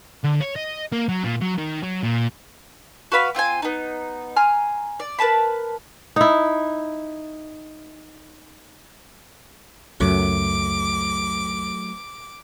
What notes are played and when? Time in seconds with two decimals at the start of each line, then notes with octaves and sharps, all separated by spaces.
0.24 D3
0.41 C#5
0.56 D#5
0.92 A#3
1.09 F#3
1.23 A#2
1.41 F#3
1.58 D#3
1.83 F#3
2.03 A#2
3.12 F#4 B4 F5 B5
3.35 C4 F4 C5 G#5
3.62 B3 D#4
4.36 G#5 A#5 C6 F6
5.00 D5
5.19 A#4 B4 A5 B5
6.16 D#4 E4
10.00 C#2 F#2 F#3 A3 D6